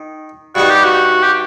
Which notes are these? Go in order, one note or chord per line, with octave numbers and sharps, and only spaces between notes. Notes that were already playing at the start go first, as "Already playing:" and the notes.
Already playing: D#3
G2 D#3 G3 F#4
G4
F#4
G4